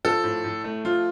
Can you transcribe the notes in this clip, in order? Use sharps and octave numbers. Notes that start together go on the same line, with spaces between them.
F3 A4
A2
A2
A3
F3 F4